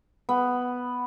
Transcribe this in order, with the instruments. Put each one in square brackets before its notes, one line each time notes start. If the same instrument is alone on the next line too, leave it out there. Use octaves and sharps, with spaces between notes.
[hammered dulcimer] B3